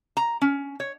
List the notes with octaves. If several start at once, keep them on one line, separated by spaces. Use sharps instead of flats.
A#5
C#4
C#5